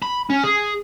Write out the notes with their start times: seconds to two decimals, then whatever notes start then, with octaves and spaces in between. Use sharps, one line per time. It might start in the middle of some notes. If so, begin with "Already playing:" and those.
0.02 B5
0.30 C#4
0.44 G#4